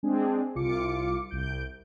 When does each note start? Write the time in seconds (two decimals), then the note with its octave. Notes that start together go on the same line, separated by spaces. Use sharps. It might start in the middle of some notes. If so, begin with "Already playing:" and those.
0.03 G#3 C4 D4 G#4
0.55 C2 F4 D6 C#7
1.29 C2 G6 D7